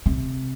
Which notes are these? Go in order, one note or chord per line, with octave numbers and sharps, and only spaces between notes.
C3